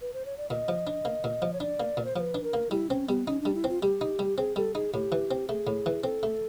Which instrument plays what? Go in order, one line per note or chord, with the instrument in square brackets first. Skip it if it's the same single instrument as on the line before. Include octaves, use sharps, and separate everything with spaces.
[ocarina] B4
C5
C#5
D5
[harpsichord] A#2 [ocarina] D#5
[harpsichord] F3
D4
A#3
A#2
F3
[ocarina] C#5
[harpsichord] D4 [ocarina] D5
[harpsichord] A#3
A#2
[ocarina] C5
[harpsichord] F3 [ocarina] C5
[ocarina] B4
[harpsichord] D4
[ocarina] A#4
[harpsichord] A#3
[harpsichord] G3 [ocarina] E4
[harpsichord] C4 [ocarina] C#4
[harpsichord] G3 [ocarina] B3
[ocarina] C#4 [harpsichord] D#4
[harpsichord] G3 [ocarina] D4
[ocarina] E4
[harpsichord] C4
[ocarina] F4
[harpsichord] G3 [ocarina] G4
[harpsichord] D#4
G3
[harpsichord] C4 [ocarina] G#4
[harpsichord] G3 [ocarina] A4
[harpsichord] D#4 [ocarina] G#4
[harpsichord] A2 [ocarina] G4
[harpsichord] E3
C4
[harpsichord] A3 [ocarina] G#4
[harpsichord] A2
E3
[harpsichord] C4 [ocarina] A4
[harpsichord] A3